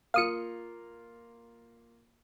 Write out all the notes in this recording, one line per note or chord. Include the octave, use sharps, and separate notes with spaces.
A#3 F4 F5 D#6 C#7